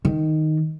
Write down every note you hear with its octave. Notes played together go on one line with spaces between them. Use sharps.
D#3